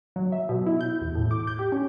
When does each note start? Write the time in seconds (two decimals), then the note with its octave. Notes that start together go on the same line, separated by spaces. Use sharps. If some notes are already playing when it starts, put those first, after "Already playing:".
0.16 F#3
0.32 E5
0.49 B2
0.66 E4
0.81 G6
1.01 E2
1.15 A2
1.31 D6
1.47 G6
1.59 G4
1.72 C#4